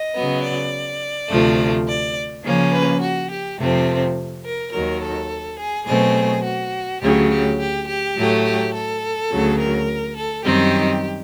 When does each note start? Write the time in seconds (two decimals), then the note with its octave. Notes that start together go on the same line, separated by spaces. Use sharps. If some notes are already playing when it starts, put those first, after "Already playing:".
Already playing: D#5
0.14 C#3 F#3 B3
0.43 D5
1.29 D2 C3 F3 A3
1.86 D5
2.44 C#3 F3 A#3 C#4
2.72 B4
3.00 F#4
3.30 G4
3.58 F2 C3 F3 A3 C4
4.44 A#4
4.72 D#2 D#3 F#3 A#4
5.01 A4
5.58 G#4
5.87 B2 F#3 A3 C4 G#4
6.44 F#4
7.01 D2 C#3 F#3 G4
7.30 G4
7.59 G4
7.87 G4
8.16 A2 F#3 A3
8.45 G4
8.73 A4
9.30 D2 C#3 F#3
9.58 A#4
10.16 A4
10.44 F#2 D#3 G3 C4 D#4 G4